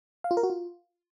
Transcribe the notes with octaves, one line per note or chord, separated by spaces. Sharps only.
F5
F4
A#4
F#4
F4